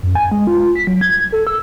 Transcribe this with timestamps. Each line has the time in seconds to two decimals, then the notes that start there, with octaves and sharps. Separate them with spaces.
0.03 F#2
0.15 G#5
0.32 G#3
0.47 F4
0.59 F4
0.76 B6
0.87 F#3
1.01 G#6
1.32 A4
1.47 E6